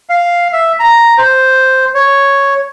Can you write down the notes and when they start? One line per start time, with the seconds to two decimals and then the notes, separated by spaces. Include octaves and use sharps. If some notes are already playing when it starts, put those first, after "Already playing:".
0.09 F5
0.53 E5
0.80 A#5
1.18 C5
1.94 C#5